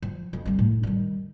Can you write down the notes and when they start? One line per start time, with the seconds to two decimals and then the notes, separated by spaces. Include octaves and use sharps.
0.02 F3
0.33 F2
0.46 G3 C4
0.59 A2
0.83 D#3 G3